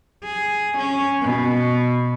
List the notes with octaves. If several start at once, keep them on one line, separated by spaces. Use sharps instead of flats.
G#4
C#4
B2